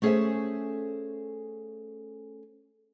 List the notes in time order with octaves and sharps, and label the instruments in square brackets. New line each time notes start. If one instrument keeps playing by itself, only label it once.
[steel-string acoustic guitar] A3 C#4 G#4 A4 C5 E5